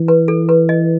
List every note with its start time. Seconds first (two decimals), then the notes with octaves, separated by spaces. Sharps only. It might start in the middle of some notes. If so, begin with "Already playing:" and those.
Already playing: E3
0.08 B4
0.28 A4
0.49 B4
0.69 D#5